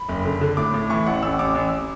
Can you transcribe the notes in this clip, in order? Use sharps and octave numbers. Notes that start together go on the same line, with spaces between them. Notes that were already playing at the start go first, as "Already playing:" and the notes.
Already playing: B5
F#1
D3
D3
A2 D6
A2 D6
E3 C#6
A1 F#5
A1 E6
A1 D6
A1 E6